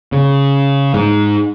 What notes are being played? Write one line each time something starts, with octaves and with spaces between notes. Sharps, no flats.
C#3
G#2